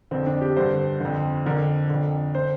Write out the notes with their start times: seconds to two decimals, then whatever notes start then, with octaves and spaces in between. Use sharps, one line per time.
0.11 F2 D3 C4
0.27 D4
0.41 G4
0.57 G2 D3 C5
1.00 F2 D3
1.46 F2 D3 A#4
1.90 F2 D3
2.34 D3 C5